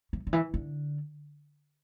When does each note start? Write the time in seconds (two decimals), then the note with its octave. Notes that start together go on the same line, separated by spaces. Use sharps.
0.13 E3
0.27 D3
0.33 E3
0.54 D3